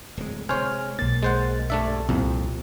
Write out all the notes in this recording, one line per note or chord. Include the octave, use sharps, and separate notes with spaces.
D1 G#3
C3 G#3 C5 C#5 G#5 F6
B1 A#3 A6
G#3 C5 F#5
G2 A3 D4 E5
C2 F2 A#2